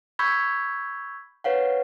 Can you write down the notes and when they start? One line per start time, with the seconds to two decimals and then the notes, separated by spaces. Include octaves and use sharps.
0.19 B5 C#6 E6 G6 G#6 B6
1.44 B4 C#5 F5 F#5